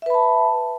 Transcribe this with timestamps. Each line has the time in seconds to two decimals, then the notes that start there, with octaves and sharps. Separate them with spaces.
0.02 E5
0.06 B4
0.10 B5
0.14 A5